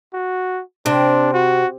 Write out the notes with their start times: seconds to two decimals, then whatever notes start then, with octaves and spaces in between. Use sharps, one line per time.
0.13 F#4
0.86 C3 D4
1.34 F#4